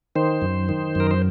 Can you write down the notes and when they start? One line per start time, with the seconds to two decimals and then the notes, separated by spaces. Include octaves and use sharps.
0.16 D#3 C5
0.42 F#2
0.69 D#3
0.95 F#2 A#4
1.11 C5